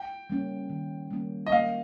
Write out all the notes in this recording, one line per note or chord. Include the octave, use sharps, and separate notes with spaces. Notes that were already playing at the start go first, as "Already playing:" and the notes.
Already playing: G5
G3 A#3 C#4
D#3
G3 A#3 C#4
D#5
A#3 F5